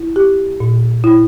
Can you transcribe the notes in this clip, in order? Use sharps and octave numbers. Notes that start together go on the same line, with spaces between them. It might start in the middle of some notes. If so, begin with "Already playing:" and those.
Already playing: E4
G4
A#2
E4